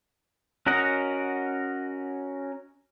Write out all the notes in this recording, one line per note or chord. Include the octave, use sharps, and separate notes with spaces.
C#4 F#4 A#4 D#5 F#5